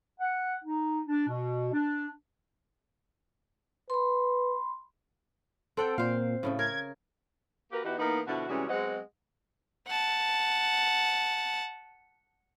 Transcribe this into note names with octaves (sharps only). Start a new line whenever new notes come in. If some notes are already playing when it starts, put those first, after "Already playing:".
F#5
D#4
D4
B2
D4
B4 B5 C6
C4 A4 F#5 G5
A#2 C5 F5
A2 C#3 A3
A#4 G#6
A#3 F#4 G4 A#4 B4
E3 B3 D#4 E4 F#4 G4
E3 A#3 B3 D#4
B2 D3 F3 E4 F#4
C3 E3 G3 G#3 C#4 F#4
F#3 G#3 B3 C4 D#5 F#5
F#5 A5